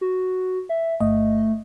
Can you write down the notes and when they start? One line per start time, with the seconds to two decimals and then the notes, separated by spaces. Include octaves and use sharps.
0.01 F#4
0.69 E5
1.00 G1 A3 D#5